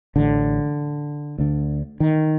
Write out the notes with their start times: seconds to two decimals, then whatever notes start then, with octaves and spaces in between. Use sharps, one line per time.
0.15 A1 A2 D3
1.38 D2 D3
2.00 D#3